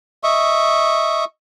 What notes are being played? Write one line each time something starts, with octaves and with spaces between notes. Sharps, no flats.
D#5 E5 C#6